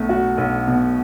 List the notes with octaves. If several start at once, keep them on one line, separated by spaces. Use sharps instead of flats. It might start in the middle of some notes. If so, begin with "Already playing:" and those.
Already playing: B1 B2 A3
F#4
B1
B2